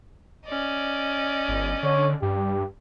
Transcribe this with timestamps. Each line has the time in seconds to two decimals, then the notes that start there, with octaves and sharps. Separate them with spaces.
0.45 C#4 D5 D#5
1.48 G1
1.83 D3 C#5
2.22 G2 G4